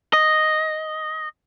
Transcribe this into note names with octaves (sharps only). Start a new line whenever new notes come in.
D#5